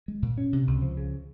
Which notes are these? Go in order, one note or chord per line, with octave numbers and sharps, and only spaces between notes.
G#3
A#2
C#4
C3
C#2
F3
C#3